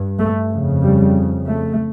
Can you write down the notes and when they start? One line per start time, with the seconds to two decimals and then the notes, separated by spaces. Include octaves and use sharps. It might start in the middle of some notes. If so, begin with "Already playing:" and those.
Already playing: G2
0.19 A3
0.51 F2 C#3
0.83 G3
1.47 A3